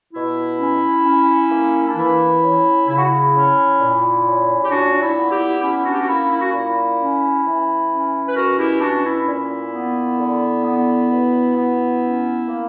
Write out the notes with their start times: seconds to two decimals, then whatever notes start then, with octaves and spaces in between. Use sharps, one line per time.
0.14 B2 E4
0.59 C#4
1.05 C#4
1.51 A#3
1.88 D4
1.96 E3 E4
2.42 C#4
2.88 C#3 E4
2.96 F#4
3.03 E4
3.34 C#4
3.79 A#2
4.25 C#4
4.64 G4
4.70 A#2 D4 F#4
4.92 D4
5.01 E4
5.17 B3
5.32 E4 G4
5.62 C#4 E4
5.85 D4 F#4
5.93 G4
6.00 F#4
6.07 A#3 E4
6.30 E4
6.40 F#4
6.51 A#2 E4
6.99 C#4
7.44 E3
7.90 C#4
8.28 B4
8.36 B2 F#4 A#4
8.59 E4 G4
8.81 C#4 D4 F#4
9.05 E4
9.27 A#2 E4
9.73 B3
10.18 D3
10.64 B3
11.10 B2
11.56 B3
12.02 C#4
12.47 A#3